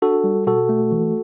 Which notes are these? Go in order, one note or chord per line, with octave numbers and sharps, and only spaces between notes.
D4 F#4 A4
G3
B2 F#4 A4
A3
E3